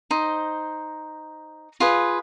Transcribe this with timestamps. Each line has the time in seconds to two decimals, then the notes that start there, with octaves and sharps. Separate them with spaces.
0.11 D#4 C5
1.80 F4 G#4 B4